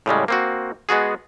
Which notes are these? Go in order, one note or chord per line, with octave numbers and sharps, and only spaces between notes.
A2 C#3 G3 G#3
A#3 C4 F#4
G#3 B3 F#4 G#4